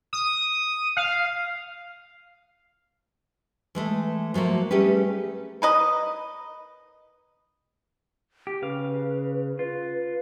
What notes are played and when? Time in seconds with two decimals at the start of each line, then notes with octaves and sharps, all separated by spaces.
0.13 D#6
0.97 F5
3.75 E3 G#3 A3
4.34 F3 F#3 A3 A#3
4.71 G3 A3 C#4 G4 G#4 B4
5.62 A#4 B4 D#5
8.47 G4
8.62 C#3 B4 F5
9.59 F4 B4